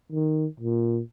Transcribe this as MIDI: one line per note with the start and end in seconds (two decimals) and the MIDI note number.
0.12 0.46 51
0.60 1.00 46